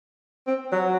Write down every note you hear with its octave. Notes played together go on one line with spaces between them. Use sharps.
C4
F#3